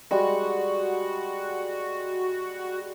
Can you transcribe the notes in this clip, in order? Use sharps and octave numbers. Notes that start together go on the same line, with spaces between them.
G3 G#3 F#4 C#6